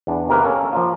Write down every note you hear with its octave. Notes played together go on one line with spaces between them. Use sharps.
E2 D4
C3 D#3 A#3 A#4 B4
A#3 C#4 A4
F3 A#3 F4